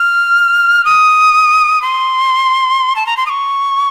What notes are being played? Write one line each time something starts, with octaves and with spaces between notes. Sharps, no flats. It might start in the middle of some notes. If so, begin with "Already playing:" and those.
Already playing: F6
D#6
C6
A5
A#5
C6
D#6
C#6